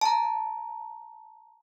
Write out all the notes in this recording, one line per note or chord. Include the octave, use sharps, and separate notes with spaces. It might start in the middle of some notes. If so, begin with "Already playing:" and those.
A5 A#5